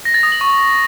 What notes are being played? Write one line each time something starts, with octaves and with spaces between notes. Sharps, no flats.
A#6
A6
D#6
F#7
C#6